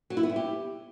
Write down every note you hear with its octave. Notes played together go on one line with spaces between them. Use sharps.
F#3
E4
B3
G3
G4